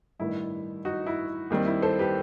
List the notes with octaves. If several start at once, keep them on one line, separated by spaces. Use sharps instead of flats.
A1 G2 D#3 E4
D#4 F#4
E4
D#2 D#3 G3 C4
E4
A4 C5
G4 B4